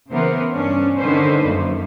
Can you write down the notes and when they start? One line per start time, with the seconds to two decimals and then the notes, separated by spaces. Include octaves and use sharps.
0.10 C#3 E3 B3 A#4 C5
0.51 G2 C#4 D4
0.98 D3 D#3 C#4 D#4 B4 C5
1.45 F#2 A#3